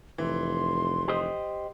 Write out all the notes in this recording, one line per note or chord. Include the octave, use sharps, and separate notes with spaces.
F1 E3 C6
G4 C5 D#5